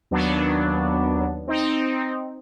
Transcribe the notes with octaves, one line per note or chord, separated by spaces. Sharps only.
D#2 F#3 B3 D4
C4 D#4